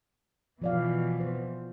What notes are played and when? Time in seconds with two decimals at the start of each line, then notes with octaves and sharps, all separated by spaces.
0.62 B2 E3 F3 D5 F5
1.20 C5